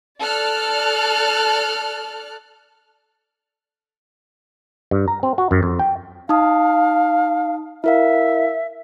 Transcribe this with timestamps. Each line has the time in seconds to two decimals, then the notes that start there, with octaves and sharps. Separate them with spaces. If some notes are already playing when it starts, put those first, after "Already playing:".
0.20 A4 D5 F6 F#6
4.91 G2
5.08 A#5
5.23 C4
5.38 F#4
5.51 F#2
5.63 F2
5.79 G5
6.29 D#4 F5 A5 D#6
7.84 E4 A#4 E5 F5